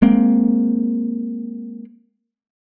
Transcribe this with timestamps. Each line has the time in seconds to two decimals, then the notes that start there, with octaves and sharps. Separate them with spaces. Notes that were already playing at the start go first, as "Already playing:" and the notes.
0.02 G#3 A#3 C4